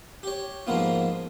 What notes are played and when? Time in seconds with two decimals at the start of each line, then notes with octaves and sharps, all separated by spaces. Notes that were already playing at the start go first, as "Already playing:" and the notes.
0.23 G4 C#5
0.67 G#2 F3 A#3 B3 F4